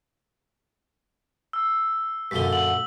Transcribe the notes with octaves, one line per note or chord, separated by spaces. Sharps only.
E6
F#2 A#2 D3 B6 G7
F#7